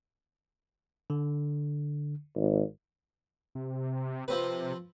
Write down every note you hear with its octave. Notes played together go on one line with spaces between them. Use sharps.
D3
G#1
C3
C3 F3 C4 B4